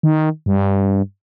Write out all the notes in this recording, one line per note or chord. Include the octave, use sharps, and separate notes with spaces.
D#3
G2